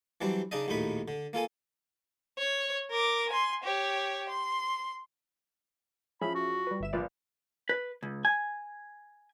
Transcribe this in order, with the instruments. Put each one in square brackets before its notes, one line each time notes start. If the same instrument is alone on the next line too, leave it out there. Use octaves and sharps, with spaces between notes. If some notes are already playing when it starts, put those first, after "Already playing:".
[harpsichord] E3 F#3 G3 C4 D4
C#3 D4 D#4 D5 D#5
A#1 D#2 A2 D#4 B5
D3
A#3 F4 A4 G#5
[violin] C#5
A#4 D6
G#5 C6
G4 C#5
C6
[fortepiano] F3 [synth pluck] C#4 G#4 E5 [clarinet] B5
[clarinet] F#4
[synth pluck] G3 B4
G1 E5 E7
[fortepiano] A#1 [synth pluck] F4 B4 D5
[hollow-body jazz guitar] B4
C#2
G#5